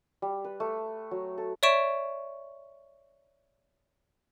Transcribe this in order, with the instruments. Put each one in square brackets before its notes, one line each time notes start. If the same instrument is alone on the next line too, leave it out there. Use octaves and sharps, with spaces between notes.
[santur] G3
B4
A3
F#3
A4
[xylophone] C#5 D5 E5 C#6 D7 E7